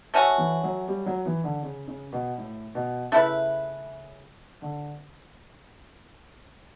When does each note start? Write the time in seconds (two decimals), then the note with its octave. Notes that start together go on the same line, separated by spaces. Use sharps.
0.14 A3 C#4 F#4
0.38 E3
0.64 F#3
0.88 G3
1.06 F#3
1.26 E3
1.44 D3
1.63 C#3
1.88 C#3
2.13 B2
2.38 A2
2.75 B2
3.12 C#3 A3 E4 B4
4.62 D3